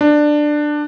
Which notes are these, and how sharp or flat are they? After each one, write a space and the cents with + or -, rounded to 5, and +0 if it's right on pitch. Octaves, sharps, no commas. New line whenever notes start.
D4 +15